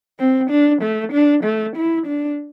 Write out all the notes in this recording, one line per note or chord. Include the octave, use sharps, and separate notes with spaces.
C4
D4
A3
D4
A3
E4
D4